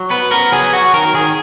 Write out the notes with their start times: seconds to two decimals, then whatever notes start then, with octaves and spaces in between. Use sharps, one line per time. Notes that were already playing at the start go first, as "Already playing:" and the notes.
Already playing: F#3
0.10 B3 B4
0.31 B3 A#4
0.52 F#3 G#4
0.73 F#3 F#4
0.93 D#3 A#4
1.14 D#3 G#4